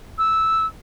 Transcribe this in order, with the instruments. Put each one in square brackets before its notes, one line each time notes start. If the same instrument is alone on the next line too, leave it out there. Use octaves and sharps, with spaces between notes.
[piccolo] E6